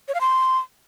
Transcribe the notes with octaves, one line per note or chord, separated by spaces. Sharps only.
C#5
F5
C6